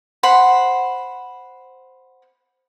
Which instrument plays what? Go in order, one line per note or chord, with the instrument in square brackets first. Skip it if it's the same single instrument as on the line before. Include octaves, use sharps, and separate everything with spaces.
[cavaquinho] C5 F#5 B5